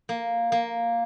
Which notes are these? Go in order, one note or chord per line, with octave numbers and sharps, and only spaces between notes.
A#3
A#3